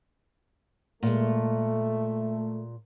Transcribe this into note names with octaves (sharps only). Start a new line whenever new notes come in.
A#2 G#3 A3